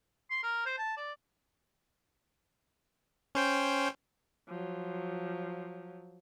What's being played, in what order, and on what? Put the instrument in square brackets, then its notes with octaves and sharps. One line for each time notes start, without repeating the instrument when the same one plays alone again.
[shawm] C6
A#4
C5
A5
D5
[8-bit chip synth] C#4 C5 G5
[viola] F3 F#3